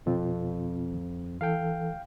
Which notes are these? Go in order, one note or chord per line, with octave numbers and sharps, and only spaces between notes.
F2 B2 C4 F4
E3 A4 F5 G5